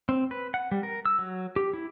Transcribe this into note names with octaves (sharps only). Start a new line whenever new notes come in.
C4
B4
F#5
G3
A#4
E6
F#3
G4
E4